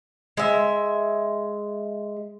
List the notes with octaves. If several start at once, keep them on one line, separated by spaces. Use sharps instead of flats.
G#3 E5